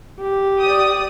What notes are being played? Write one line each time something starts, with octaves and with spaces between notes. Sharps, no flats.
G4
D5 D#6